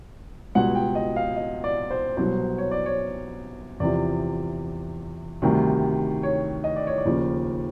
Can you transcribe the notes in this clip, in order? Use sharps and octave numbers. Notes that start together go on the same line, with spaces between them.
C#2 B2 G3 F#5
G5
D#5
F5
D#5
D5
C5
C2 B2 F#3 C5
C#5
D5
C#5
E2 C3 F3 D5
D2 C3 D#3 G3
C#5
D#5
D5
C#5
D5
D#2 C#3 F3